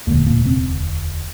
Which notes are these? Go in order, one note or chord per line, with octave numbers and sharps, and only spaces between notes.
E1 D2 A#2 D3 A#3
A#2 A#3
C3 C4